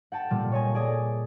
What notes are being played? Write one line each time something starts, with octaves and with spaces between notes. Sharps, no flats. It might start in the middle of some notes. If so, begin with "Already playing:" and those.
F#5 G5 A5 A6
A#2 G3
C#5 D#5 G#5
G#4 D5 D#5 G#5 D#6